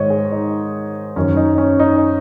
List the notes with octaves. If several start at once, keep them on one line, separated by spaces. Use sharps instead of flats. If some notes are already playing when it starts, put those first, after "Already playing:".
Already playing: G#2 D#3 C#5 D#5
G#4
D#4
F#2 D#3 C#4
D#4
C#4
D#4